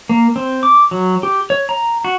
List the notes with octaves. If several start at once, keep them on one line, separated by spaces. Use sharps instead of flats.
A#3
C4
D6
F#3
G4
C#5
A#5
F#4